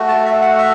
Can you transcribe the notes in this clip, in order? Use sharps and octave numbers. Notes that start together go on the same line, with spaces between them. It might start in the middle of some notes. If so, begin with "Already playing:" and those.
Already playing: A3 F#4
A5
E5
F#5
E5